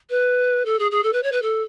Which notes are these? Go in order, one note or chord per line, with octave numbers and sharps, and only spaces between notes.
B4
A4
G#4
G#4
A4
B4
C#5
B4
A4